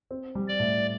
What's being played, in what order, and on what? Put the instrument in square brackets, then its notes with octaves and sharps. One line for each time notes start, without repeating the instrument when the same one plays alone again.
[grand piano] C4
G3
[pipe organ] D5
[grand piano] A2